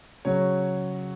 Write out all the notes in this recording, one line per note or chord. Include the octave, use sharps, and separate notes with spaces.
C#3 F#3 C#5